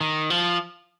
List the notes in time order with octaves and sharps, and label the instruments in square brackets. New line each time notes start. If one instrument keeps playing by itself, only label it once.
[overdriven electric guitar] D#3
F3